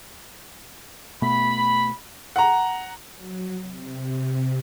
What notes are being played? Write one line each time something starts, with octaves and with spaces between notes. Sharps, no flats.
B2 A3 B3 B5
F#5 A#5
F#3
C3